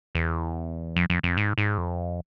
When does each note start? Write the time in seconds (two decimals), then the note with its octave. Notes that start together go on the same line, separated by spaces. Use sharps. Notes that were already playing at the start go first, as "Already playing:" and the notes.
0.15 E2
0.96 F2
1.10 F2
1.23 F2
1.37 G#2
1.58 G#2
1.78 F2